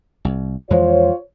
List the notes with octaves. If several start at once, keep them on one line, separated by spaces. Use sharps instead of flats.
C2
F2 E3 G#3 F4 C5 C#5